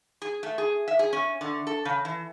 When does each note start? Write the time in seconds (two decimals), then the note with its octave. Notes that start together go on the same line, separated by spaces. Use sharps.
0.22 G#4
0.43 A3
0.58 G#4
0.88 E5
0.99 G#4
1.13 C#4
1.41 D3
1.67 A4
1.85 C#3
2.05 E3